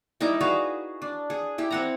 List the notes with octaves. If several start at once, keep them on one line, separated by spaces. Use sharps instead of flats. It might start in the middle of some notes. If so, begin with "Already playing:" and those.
G3 D#4 E4 D6
F#4 G#4 B4 F5
D4
G#4
E4 G4
C4 F#5 A#5